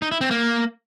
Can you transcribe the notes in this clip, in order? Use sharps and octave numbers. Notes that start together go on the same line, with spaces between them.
D#4
E4
C4
A#3